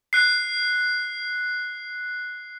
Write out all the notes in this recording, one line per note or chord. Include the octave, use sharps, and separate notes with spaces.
F#6 C7